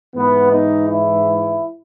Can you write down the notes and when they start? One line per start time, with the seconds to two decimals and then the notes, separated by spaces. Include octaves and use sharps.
0.16 G#2 E3 B3
0.51 D#4
0.88 E4